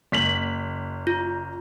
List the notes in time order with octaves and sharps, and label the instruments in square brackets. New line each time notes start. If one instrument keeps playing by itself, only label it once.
[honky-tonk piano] F#1 B6 F#7
[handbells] F4